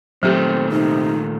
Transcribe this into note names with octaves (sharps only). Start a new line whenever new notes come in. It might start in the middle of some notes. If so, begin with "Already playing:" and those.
A#2 D#3 F#3 A3 C4 G4
C3 D#4